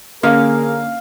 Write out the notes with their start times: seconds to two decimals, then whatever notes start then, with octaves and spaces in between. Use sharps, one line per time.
0.23 D3 A#3 C#4 G#4 A#4 F5